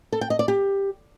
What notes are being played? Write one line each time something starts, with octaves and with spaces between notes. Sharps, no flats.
A4
G5
D#5
D5
G4